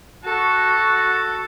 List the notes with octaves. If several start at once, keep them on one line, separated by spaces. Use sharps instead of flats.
F#4 A4